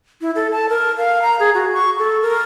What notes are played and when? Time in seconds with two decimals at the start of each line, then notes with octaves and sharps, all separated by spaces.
0.21 E4
0.35 A4
0.52 A5
0.69 A#4
0.98 F5
1.22 A#5
1.40 G#4
1.54 F#4
1.73 C#6
1.99 A4
2.22 A#4